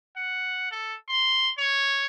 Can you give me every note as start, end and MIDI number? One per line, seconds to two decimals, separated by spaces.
0.17 0.69 78
0.71 0.94 69
1.08 1.52 84
1.58 2.06 73